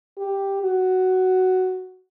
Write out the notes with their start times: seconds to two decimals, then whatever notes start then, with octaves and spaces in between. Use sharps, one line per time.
0.18 G4
0.63 F#4